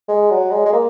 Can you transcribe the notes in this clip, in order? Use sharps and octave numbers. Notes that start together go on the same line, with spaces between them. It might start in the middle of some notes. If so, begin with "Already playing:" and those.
G#3
F#3
G#3
G#3
A#3